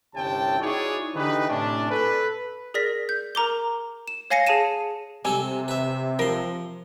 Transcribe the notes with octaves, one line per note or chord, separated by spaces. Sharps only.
G1 C2 C3 C#4 G5 A5
D#4 E4 F#4 G#4 C#5 D5
D3 E3 D#4 G4 B4
A2 C3 C#4 D4
A4 B4
G#4 A#4 D5 A#6 B6
G6
A#4 A#5 D6 G7
E7
C#5 F5 G#5 A#6 C7 C#7
G#4 C#5 A5 C#7 D#7 E7
C3 G3 C4 A4 G#5
B4 E5
F3 A#4 C6